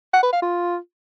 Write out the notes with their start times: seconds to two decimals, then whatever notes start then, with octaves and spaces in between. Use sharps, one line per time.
0.13 F#5
0.23 B4
0.33 F5
0.42 F4